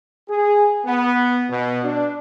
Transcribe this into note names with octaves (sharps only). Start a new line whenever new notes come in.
G#4
B3
B2
D4